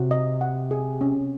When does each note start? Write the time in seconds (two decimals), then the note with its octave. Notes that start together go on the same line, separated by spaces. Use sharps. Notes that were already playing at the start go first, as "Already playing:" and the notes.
Already playing: C3 F#4
0.11 D#5
0.41 F#5
0.71 G#4
1.01 C#4